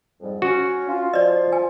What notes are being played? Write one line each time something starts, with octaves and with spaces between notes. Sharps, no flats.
F2 G#2 G3
C#4 F#4
F4
F3 F4 D5 D#5
G#5